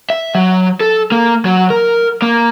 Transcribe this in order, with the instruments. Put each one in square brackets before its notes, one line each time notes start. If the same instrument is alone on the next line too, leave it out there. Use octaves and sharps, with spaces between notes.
[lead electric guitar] E5
F#3
A4
A#3
F#3
A#4
A#3